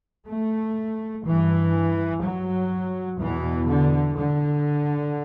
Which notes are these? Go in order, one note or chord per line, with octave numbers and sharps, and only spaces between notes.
A3
G2 E3
F#3
E2 B2 E3
D3
D3